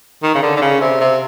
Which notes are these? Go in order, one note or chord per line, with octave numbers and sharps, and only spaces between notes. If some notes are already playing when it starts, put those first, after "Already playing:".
D#3
C#3
D3
D3
C#3
C3
C3